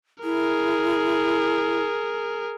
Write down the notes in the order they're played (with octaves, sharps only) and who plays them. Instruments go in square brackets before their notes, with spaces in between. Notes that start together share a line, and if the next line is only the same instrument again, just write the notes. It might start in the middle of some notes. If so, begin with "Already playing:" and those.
[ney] E4 [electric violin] G#4 A#4